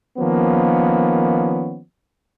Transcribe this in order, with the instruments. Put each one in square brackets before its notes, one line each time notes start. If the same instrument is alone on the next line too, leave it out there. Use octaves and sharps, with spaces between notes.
[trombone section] D#3 F3 A#3 B3 C#4